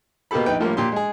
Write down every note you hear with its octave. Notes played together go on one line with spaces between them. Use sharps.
B2 A#3 B3 G4 A4 B5
A#1 D#4 B4 G5
A2 F3 G3 A#3
A#2 G4 C6
G#3 G#4